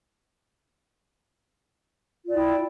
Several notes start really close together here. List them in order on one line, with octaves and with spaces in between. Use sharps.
F4 D5 E4 G5